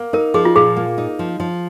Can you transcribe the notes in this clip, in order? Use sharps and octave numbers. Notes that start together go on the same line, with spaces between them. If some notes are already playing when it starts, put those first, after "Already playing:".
Already playing: A#3
D#4 A#4
F3 G#4
F4
A#2 G#4
A#3
D#4
F3
F3